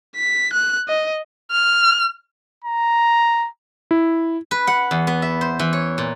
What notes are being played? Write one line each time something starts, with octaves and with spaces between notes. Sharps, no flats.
B6
F#6
D#5
F6
A#5
E4
B4
F#5
E2
B3
E5
C5
E3
C#5
A#2